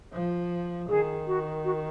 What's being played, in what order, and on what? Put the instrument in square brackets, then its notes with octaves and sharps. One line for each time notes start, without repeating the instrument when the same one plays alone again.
[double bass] F3
[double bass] D#3 [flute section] G#4
[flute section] F#4
F#4